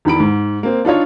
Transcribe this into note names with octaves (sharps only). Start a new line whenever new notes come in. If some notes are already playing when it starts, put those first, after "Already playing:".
E2 D#3 B5 D7
G#2
A#3 C4
D4 D#4 F4 C#5